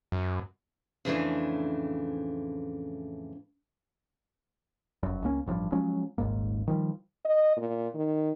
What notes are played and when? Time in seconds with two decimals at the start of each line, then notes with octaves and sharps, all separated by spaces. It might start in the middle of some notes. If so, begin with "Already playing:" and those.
0.12 F#2
1.05 F2 A2 C#3 E3 A3 D4
5.03 F1 F#2
5.24 C#2 A#3 C#4
5.46 A1 D2 G2 F3
5.72 F3 F#3 G#3 C#4
6.18 D#1 G#1 G#2 A#3
6.67 D#3 F3 G3
7.25 D#5
7.57 A#2
7.94 D#3